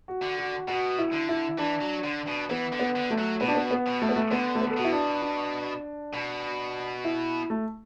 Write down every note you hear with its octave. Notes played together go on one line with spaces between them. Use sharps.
F#4
D3
F#4
B2 F#4
E4
D3
E4
E3 D4
F#3
D3
B2
E3 B3
D3
B3
D3
A3
F#3
B2 B3
D4
B3
B3
B2
A3
B3
A3
D3 B3
A3
B3
A4
B2 F#4
E4
D4
D4
B2
E4
A3